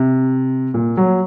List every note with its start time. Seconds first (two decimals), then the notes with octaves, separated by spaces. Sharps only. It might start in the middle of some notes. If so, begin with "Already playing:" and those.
Already playing: C3
0.74 A#2
0.97 F#3